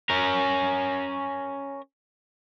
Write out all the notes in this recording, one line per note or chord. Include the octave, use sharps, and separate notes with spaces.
C#4 A#4